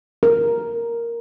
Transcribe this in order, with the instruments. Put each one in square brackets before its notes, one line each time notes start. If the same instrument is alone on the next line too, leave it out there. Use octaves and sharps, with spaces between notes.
[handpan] A#4